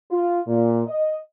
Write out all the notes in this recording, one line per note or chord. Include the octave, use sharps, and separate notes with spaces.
F4
A#2
D#5